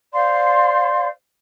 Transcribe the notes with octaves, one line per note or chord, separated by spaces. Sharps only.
C5 D5 F5 C6